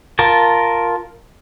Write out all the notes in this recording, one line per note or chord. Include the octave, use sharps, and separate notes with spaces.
F4 A#4 A5